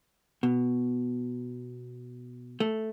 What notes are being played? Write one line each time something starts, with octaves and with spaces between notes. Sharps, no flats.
B2
A3